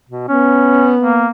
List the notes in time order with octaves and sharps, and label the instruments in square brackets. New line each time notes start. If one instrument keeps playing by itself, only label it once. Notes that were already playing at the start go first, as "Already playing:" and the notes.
[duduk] B2
[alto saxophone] B3 [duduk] C#4
[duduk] A#3